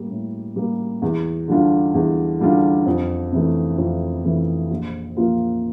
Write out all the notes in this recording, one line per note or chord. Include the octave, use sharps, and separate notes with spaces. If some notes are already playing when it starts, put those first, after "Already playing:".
Already playing: A2 G3 A#3
A2
G3 A#3
E2
D3 G3 D4 F4
E2
D3 G3 D4 F4
F2
C3 E3 A3
F2
C3 E3 A3
A#1
A#2 F3 A#3 F4